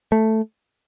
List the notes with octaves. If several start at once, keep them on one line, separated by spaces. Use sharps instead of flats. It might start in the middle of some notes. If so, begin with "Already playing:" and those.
A3